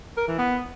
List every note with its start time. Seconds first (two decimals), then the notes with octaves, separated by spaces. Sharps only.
0.17 A#4
0.28 E3
0.38 B3